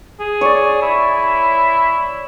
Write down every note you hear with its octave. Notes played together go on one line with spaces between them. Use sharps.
G#4
C#5 D5
E4